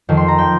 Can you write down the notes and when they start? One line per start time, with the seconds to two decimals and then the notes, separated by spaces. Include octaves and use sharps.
0.09 F2 D#3
0.17 C6
0.28 A#5
0.38 F3 G5